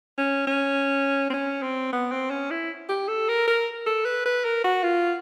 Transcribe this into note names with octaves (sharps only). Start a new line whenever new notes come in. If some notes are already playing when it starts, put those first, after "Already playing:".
C#4
C#4
C4
C#4
C4
B3
C4
C#4
E4
G4
A4
A#4
A#4
A4
B4
B4
A#4
F#4
F4